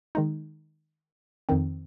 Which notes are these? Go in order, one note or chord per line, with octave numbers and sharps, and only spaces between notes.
D#3 G#3 D#4
F2 D#3 C4